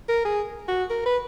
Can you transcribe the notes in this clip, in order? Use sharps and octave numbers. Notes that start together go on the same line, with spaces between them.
A#4
G#4
F#4
A#4
B4